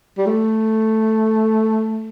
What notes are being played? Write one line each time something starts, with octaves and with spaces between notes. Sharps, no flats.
G3
A3